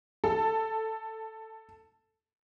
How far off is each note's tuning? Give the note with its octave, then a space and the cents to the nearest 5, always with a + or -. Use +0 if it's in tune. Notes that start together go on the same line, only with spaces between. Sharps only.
A4 +5